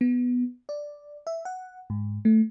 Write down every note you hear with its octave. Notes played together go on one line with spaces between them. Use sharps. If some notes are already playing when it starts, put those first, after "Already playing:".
B3
D5
E5
F#5
G#2
A3